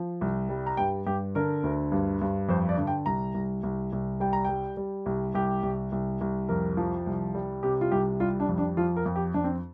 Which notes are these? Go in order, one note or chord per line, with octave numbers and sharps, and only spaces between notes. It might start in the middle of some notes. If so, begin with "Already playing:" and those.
Already playing: F3
C2
G3
A#5
G2 G5
G2 G4
D3 A#4
D2
G2
G2
F2 C5
D5
D3
G5
C2 A#5
C2
C2
C2
G3 G5
A#5
G3 G5
G3
C2
C2 G4
C2
C2
C2
F2 A#4
F3
C2
G3
C3 G4
F4
C2 G4
G3 F4
D4
F2
D4
F3 F4
A#4
F2
G4
F2 D4
C4